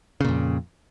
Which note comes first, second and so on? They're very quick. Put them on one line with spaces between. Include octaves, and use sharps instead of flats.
C#3 A#2 F2